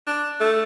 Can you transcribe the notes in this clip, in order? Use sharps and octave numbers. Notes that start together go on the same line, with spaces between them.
D4
A3